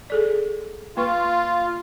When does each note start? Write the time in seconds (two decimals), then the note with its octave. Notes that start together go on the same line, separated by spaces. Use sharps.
0.10 G#4 A4 D5
0.97 A#3 F4 B4 C#6